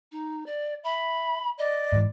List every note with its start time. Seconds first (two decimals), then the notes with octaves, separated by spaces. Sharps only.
0.12 D#4
0.46 D5
0.84 E5 B5
1.59 D5 D#5
1.92 G#2 E3